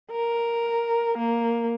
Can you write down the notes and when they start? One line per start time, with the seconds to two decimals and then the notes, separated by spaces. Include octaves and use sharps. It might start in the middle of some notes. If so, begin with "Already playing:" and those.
0.11 A#4
1.18 A#3